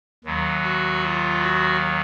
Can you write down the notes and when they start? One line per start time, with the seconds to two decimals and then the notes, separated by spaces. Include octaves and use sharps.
0.24 D#2 D#3 F#3
0.62 F#4
1.03 F4
1.42 F#4